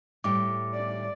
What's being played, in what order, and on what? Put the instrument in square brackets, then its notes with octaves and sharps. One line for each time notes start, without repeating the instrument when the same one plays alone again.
[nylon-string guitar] A2 G3 G4 [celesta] D6
[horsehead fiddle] D5